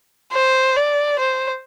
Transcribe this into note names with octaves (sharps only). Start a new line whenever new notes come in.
C5
D5
C5